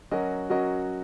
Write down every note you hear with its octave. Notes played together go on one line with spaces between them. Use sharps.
F#3 C#4 F#4 A#4 D#5
F#3 C#4 F#4 A#4 D#5